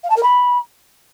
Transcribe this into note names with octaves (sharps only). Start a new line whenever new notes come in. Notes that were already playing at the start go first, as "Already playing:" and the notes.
F5
A5
A#4
B5